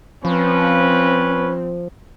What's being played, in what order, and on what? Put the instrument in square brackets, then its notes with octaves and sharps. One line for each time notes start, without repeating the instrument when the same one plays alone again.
[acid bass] F3 [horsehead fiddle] C4 [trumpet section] C#4 B4